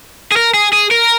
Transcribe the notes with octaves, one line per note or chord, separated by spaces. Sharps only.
G#4
A#4
G#4
G#4
A#4